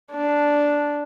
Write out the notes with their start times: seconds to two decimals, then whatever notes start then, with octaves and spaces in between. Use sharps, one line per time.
0.12 D4